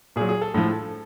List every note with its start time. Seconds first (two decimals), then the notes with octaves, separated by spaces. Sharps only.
0.16 A#2 G#4
0.21 F#3
0.29 G#4
0.41 A4
0.54 A2 F3 A4